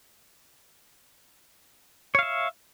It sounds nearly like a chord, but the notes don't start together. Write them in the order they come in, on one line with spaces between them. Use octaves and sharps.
C#5 F5 E5